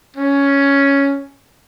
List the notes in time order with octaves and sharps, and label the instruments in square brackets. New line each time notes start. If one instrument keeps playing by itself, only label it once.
[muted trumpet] C#4